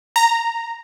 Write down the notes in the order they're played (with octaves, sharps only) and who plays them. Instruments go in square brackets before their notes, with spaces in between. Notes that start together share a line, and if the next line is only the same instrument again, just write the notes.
[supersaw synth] A#5